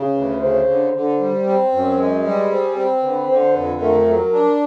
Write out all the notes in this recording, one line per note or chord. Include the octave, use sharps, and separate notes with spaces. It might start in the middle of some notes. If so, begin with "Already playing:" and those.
Already playing: C#3
D2 B4
C#3 C5
D3
D3
G3
C4
F#2
G#3
G3 B4
C4 G#4
C4
D3 B4
D3 C5
F2 B4
A3 A#4
F#3
D4